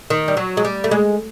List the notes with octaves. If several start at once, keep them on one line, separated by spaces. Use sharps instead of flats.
D#3
G3
F#3
G#3
G3
A3
G#3